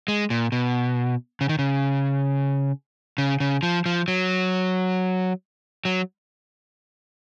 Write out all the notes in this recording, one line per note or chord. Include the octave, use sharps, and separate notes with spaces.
G#3
A#2
B2
C#3
D#3
C#3
C#3
C#3
F3
F3
F#3
F#3